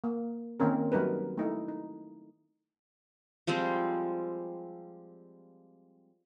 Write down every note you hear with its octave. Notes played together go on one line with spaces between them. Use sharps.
A#3
D#3 A#3 C4 C#4 A#4
F#3 G3 D#4 A#4 B4
A3 D#4 E4
D#4
F3 G3 G#3 C4